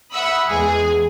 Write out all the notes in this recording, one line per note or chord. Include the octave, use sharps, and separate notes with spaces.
E5 F#5 B5 D#6 E6
E2 G#3 G#4 G#5